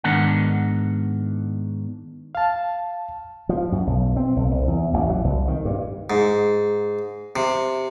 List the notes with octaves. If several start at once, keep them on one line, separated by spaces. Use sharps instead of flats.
G#2 D#3 B3 D4 A#4 F#5
F5 A5
F3
F#2
B1
C4
B1
C2
E2
A1
F#3
C2
D#3
G2
G#2
C3